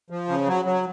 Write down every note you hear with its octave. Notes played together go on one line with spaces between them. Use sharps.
F3
C#3
F#3
F#3